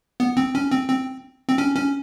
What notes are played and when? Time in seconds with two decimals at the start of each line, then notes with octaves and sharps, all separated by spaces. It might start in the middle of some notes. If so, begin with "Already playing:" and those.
0.20 B3
0.37 C4
0.55 C#4
0.71 C4
0.88 C4
1.48 C4
1.58 C#4
1.76 C#4